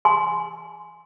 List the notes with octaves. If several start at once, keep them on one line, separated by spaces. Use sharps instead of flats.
G#5 C6